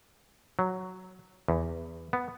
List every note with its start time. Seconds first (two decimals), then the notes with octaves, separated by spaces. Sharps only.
0.59 F#3
1.48 E2
2.13 B3